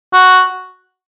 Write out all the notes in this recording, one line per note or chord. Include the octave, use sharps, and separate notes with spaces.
F#4